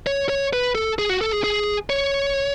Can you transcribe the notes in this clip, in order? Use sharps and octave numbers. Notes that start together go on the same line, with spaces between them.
C#5
C#5
B4
A4
G#4
F#4
A4
G#4
G#4
C#5